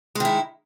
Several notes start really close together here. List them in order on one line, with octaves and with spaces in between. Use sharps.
G#3 D#3 E4